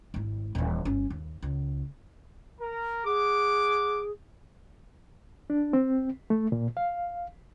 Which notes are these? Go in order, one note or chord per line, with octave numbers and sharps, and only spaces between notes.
G#1 E4
D#1 E3
G1 C#4
D#2
C#2
A#4
G#4 F#5 D6
D4
C4
A3
A#2
F5